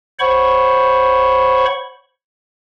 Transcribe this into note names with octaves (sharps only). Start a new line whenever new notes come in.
C5 C#5 F#5 B5 C#6